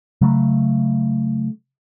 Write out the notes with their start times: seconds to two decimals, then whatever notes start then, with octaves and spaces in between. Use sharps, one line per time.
0.21 C#3 F#3 A3